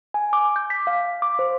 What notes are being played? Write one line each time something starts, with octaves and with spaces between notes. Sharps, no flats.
G#5
D6
G6
B6
F5
D6
C5